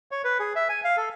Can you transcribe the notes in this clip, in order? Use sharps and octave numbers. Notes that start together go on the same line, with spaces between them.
C#5
B4
G#4
E5
G#5
F5
A4